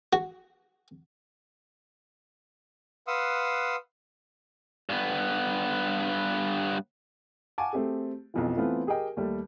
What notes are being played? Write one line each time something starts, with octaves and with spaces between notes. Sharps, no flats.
F#4
B4 F5 F#5 C6 D#6 E6
G2 B3
F5 F#5 G#5 A5 C#6 D6
A3 C4 G4 G#4
B1 F2 E3
E3 A3 B3 C4 F4
G4 G#4 A#4 D#5 G5
D#2 G3 A3